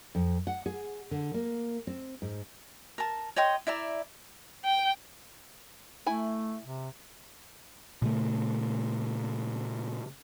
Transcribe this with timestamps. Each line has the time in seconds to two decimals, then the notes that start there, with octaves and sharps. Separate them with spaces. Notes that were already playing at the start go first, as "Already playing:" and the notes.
0.15 F2
0.47 F#5
0.66 G#4
1.11 D3
1.34 A#3
1.87 C4
2.22 G#2
2.98 A#4 A5
3.36 C#5 D#5 G5 C6
3.67 E4 D5 E5 A#5
4.65 G5
6.06 A3 E4 G#5
6.63 C3
8.02 A#2 C#3 A3